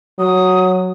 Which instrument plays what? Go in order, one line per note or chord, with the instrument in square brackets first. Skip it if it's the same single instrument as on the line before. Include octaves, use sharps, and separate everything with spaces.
[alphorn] F#3 [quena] D#6